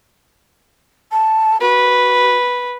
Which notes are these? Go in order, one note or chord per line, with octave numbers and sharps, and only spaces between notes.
A5
F#4 B4